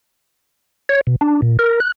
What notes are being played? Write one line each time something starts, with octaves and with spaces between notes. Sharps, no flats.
C#5
B2
D4
A#2
A#4
F#6